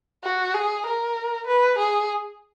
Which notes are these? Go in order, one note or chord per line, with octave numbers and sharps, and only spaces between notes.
F#4
G#4
A#4
B4
G#4